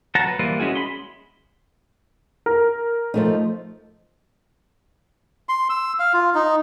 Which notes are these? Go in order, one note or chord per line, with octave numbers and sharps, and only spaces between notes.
F#3 C5 F#5 A5 A#5
B4
E3 G3 A#3 B4 C5
G#3 C#4 E4 F#4 G#4
B5 C6
A#4
F3 A3 D#4
C6
E6
F5
F4
D#4